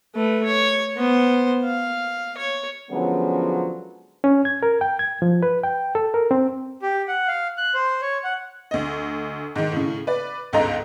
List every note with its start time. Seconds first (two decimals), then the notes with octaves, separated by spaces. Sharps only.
0.15 A3 B4
0.44 C#5
0.97 B3 C5
1.65 F5
2.37 C#5
2.90 D3 F3 F#3 G#3 B3 C#4
4.24 C#4
4.45 G#6
4.63 A#4
4.81 G5
4.99 G#6
5.22 F3
5.43 B4
5.64 G5
5.95 A4
6.14 A#4
6.31 C4
6.82 G4
7.08 F#5
7.28 F5
7.58 F#6
7.74 C5
8.02 C#5
8.24 F#5
8.71 D2 D#5
9.56 G#2 D#3
9.72 A2 C#3
10.07 B4 D5
10.53 G1 C#2 G#2 A4 D#5 A#5